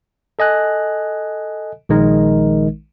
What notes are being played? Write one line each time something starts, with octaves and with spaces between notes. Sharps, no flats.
A4 D#5 G#5 F#6
A#1 D#3 G#3 D#4 A#4